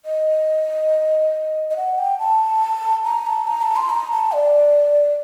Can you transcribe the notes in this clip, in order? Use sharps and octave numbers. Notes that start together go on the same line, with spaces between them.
D#5
D#5
F#5
G5
A5
A#5
A5
A#5
A5
C6
A#5
A5
D5